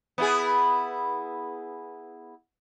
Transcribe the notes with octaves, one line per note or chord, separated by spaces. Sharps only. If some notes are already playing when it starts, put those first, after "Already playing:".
B3 E4 G#4